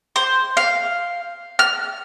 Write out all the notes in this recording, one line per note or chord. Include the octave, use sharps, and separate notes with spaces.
C5
F5
F6